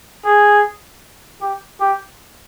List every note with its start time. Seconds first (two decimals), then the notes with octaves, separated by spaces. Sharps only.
0.25 G#4
1.41 G4
1.81 G4